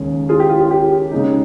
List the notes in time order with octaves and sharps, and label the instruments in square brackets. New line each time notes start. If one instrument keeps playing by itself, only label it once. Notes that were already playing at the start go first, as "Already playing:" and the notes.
Already playing: [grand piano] D#2 C#3 G#3 C#4
[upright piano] F4 G#4
G4
F4
F4
G4
[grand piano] C#3 G#3 D#4